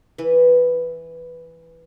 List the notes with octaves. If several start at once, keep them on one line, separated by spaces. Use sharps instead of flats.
E3 B4